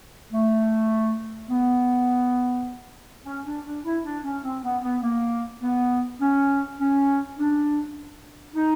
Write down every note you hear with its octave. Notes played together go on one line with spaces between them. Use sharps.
A3
B3
C#4
D4
D4
E4
D4
C#4
C4
B3
B3
A#3
B3
C#4
C#4
D4
D#4